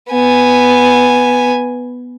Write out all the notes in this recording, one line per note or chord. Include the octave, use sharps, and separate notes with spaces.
B3 G#5